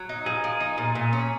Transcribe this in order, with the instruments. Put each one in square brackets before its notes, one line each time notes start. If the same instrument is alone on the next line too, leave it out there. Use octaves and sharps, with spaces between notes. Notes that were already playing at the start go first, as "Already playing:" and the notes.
Already playing: [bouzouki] F#3
D#4
[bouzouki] F3 [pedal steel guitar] G#4
[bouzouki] F3
D#4
A#2
A#2
C#4